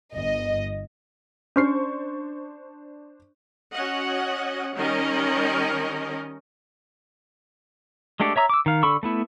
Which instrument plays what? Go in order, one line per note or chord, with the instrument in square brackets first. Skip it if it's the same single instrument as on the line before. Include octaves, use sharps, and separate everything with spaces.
[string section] G1 D#5
[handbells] C#4 F6 C7 [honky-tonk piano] D4 C5 C#6
[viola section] C#4 F#4 D#5 F#5
D#3 G3 C#4 A#4 D#5
[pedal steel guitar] G#3 A3 D4 G4 A4
C#5 E5 A#5 D#6 E6
D6 E6
D#3 F5
D3 A4 B5 C#6 E6
A3 B3 E4